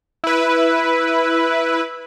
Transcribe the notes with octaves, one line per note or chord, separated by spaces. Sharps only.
E4 B4